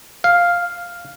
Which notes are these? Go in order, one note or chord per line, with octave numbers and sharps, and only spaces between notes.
F5